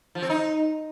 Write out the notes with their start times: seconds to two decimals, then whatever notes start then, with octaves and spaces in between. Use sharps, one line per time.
0.15 F3
0.22 C4
0.30 D#4